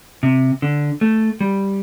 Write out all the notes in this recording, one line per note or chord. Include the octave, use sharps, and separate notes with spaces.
C3
D3
A3
G3